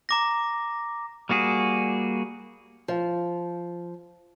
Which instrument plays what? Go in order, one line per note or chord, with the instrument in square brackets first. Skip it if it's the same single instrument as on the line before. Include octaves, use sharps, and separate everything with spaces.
[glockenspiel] A#5 D6 A#6
[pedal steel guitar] G3 A#3 F#4 G#4
[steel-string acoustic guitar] F3